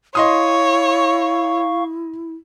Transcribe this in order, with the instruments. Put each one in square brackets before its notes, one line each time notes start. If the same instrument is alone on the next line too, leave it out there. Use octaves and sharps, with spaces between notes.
[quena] E4 [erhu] C#5 [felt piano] D#5 C6 D#6 [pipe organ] F5 C#6